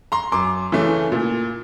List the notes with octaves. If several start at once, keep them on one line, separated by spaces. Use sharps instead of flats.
A#5 C6
F#2 C6 D6
C#3 E3 A3
A#2